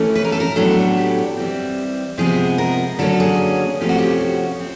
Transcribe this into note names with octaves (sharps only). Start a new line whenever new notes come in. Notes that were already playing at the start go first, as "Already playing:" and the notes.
Already playing: E3 A3 C#4
B4
A#4
A4
A#4
A2 F#3 B3 D4 A4
G4
E3 G3 C4
C3 F3 G#3 B3 G#4
A#4
D3 F#3 A#3 C#4 A4
G#4
C3 F3 A3 C#4 G4
F#4
G4
F#4
C4